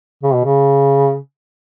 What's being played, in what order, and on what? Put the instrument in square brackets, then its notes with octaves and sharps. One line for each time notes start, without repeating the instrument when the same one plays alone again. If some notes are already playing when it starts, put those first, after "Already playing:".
[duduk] C#3
B2
C#3